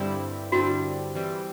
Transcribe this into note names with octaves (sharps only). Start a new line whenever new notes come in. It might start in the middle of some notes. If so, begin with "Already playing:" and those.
Already playing: G2 D3 G3 C4 E4
G2 D3 G3 C4 E4 F#4
E3 G3 C4